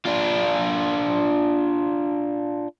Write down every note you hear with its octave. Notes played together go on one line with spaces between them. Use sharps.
D4 F4